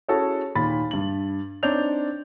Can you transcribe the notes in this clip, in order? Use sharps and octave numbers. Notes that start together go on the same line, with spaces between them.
C#4 E4 F#4 G#4 A4 C#5
D#2 A#2 B5 A6
G2 F#7
C4 D4 D#4 C#5 G6 F7